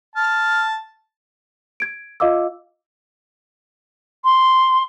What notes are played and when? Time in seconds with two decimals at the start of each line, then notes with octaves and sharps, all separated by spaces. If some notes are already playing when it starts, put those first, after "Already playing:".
0.16 A5 F6
1.80 G#6 D7
2.20 F4 D#5 F5 D6 E6
4.24 C6